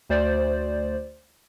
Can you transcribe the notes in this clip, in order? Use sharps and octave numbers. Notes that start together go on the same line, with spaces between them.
D2 C5 D5